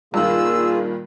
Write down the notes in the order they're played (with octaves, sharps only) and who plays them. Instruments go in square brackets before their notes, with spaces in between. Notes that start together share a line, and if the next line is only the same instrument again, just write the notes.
[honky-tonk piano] G2 D#3 [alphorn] A#2 [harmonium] A#3 F4 G#4 [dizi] E6